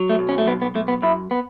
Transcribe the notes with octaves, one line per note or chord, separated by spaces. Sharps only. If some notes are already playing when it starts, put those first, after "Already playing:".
Already playing: F#3
A3
B1
C#4
A3
B1 B3
B3
B1 A3
B3
F#2 E4
B3